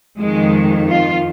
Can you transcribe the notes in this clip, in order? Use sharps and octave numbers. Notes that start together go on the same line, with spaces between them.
F2 D#3 G#3
F4